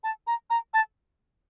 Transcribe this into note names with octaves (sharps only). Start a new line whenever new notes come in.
A5
A#5
A#5
A5